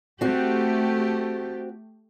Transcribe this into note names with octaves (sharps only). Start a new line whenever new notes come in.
A3 C4 F#4 G4